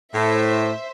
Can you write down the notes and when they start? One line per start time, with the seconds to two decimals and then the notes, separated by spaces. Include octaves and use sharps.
0.14 A2 C5 E5